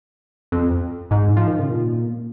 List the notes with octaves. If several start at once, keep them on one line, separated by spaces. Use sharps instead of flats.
F2
G#2
F3
D#3
C#3
A#2